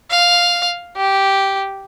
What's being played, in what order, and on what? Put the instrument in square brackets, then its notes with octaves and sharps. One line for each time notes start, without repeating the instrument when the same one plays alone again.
[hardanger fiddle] F5
G4